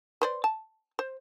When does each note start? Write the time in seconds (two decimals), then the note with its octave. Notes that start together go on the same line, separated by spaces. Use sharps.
0.22 B4 C5 D5
0.44 A5
0.99 C5